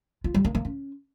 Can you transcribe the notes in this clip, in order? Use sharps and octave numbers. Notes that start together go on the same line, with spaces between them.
F4
G3
A#3
A#3
C#4